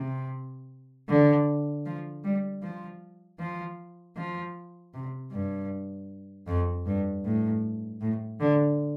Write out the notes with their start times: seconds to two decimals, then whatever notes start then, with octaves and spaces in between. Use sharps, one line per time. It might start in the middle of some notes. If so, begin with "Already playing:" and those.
Already playing: C3
1.08 D3
1.86 F3
2.24 G3
2.63 F3
3.39 F3
4.16 F3
4.94 C3
5.32 G2
6.47 F2
6.86 G2
7.25 A2
8.01 A2
8.40 D3